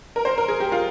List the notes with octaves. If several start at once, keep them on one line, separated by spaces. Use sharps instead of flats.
A#4
C5
A#4
G#4
G4
F4